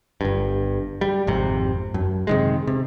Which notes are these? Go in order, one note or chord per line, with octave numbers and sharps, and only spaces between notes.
G1 G2
G3
G#1 F2 C3
F#2
C3 D#3 G#3
C3